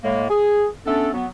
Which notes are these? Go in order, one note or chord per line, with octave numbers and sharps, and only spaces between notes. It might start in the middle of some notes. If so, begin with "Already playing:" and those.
A2 G#3 A#3
G#4
A3 B3 C#4 D4 A4
F#3 B3